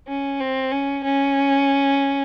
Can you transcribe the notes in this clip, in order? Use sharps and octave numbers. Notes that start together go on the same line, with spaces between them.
C#4
C4
C#4
C#4